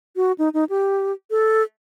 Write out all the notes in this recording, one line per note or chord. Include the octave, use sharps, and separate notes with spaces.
F#4
D#4
D#4
G4
A4